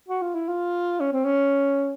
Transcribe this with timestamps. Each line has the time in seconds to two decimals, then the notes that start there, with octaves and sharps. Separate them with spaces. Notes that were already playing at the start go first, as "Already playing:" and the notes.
0.08 F#4
0.22 F4
0.35 E4
0.48 F4
1.00 C#4
1.13 C4
1.25 C#4